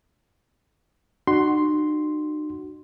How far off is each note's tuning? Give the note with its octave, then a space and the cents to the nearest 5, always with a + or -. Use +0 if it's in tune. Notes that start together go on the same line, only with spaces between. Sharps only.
D#4 -45 F#4 +10 C6 +0